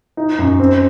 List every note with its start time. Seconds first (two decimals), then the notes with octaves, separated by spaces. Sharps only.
0.17 D#4
0.39 F#2
0.60 C4